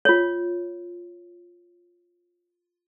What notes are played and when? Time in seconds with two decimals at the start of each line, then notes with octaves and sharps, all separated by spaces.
0.05 F4 C#5